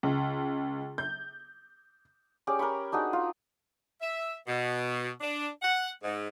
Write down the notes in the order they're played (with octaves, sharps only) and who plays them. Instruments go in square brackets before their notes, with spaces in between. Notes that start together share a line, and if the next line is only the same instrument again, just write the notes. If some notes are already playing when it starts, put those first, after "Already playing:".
[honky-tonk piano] C#2
G6
[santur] C#4 G4 G#4 D5
A#4 G5 B5 C#6
D4 D#4 F#4 G#4
F4
[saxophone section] E5
B2
D4
F#5
G#2